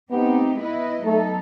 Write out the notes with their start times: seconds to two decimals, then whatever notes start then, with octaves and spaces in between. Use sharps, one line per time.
0.11 A3 B3 C4 D#4 G4
0.58 B3 E4 B4 D#5
1.05 F#3 A3 B3 D#4 A4